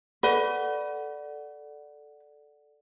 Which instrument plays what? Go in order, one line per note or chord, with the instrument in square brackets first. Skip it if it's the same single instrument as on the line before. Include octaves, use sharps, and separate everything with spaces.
[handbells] A4 D5 F#5 [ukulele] B4